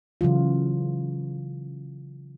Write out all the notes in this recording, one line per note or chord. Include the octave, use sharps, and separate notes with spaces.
C#3 E3 F#3 F4